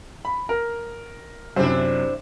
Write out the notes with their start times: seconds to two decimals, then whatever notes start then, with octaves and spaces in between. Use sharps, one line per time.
0.25 B5
0.49 A#4
1.56 F#2 C3 D4 E4 C5